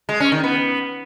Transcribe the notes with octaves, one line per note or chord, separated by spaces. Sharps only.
G#3
C#4
D#3
B3